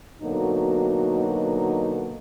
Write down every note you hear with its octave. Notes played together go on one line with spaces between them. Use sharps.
B2 D3 F#3 A#3 D#4 F#4